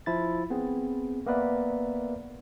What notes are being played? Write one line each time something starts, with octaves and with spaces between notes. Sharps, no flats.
F3 E4 A6
B3 C4 G#4
A#3 B3 A#4 B4 D5 E5